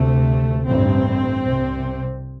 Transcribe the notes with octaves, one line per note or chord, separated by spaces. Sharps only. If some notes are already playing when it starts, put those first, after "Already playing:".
Already playing: D2 C3 A3
A1 G2 C4
C2 C3